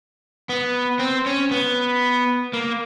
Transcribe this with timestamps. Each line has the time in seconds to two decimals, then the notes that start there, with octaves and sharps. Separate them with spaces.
0.49 B3
0.99 C4
1.26 C#4
1.51 B3
2.53 A#3